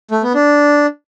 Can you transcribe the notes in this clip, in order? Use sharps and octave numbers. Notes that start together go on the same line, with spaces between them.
A3
B3
D4